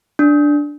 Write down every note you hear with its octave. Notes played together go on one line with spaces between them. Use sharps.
D4